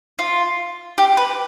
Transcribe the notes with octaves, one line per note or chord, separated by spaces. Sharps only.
F4
G4
B4